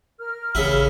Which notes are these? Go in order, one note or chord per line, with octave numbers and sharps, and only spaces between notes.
A#4 F6
A1 C#3 E4